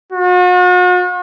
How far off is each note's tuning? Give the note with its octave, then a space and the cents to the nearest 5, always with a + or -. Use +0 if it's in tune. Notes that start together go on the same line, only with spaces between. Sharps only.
F#4 -45